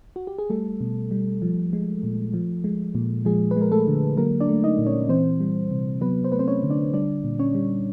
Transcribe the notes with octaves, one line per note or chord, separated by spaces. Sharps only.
F#4
G4
G#4
G3 A3 A4
B2
G3
F3
G#3
A#2
F3
G#3
A#2
F3 G#3 G#4
B4
G#3 A#4
A3 A4
D3
F#3 A#3 A#4
D4 D5
A3
D#4 D#5
A#2
C#4 C#5
E3 C4 C5
G3
C3
F#3 B3 B4
C5
A3 B4
C4 C5
C#4 C#5
D3
D4 D5
G3 D4 D5
A#2
C#4 C#5
G3